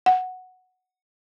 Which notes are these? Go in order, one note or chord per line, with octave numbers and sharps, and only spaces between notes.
F#5